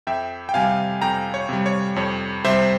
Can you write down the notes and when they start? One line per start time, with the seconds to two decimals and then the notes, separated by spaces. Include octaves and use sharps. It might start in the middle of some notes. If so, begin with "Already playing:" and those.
0.07 F2 E5 G5
0.49 G5
0.54 C3 G3 F5 G#5
1.02 F2 G5 A#5
1.34 C#5
1.49 C3 G3
1.66 C#5
1.96 F2 C#5
2.44 C3 G3 C5 E5